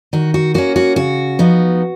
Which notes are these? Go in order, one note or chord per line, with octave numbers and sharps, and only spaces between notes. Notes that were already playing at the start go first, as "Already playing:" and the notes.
D#3 F#4
F#4
A#3 C#4 F#4
F#4
C#3 F#4
F3 B3 D#4